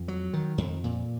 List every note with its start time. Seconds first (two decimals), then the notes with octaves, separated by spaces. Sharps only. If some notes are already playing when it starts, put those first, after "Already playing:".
Already playing: F2
0.08 F#3
0.33 D#3
0.58 F2
0.84 A#2